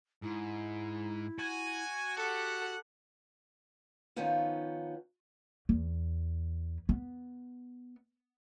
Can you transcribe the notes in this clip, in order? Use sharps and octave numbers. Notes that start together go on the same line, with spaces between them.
G#2 E4
F#4 G#5
G4 A4 F#5
D#3 F3 B3 C#4 D#4 F4
E2
B3